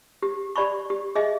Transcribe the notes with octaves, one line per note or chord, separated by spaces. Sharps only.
G4
G4 D5 B5 C#6
G4
G#4 D#5 E5